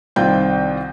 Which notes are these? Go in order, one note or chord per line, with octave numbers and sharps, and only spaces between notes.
C2 D#3 C4 F4 G5 G6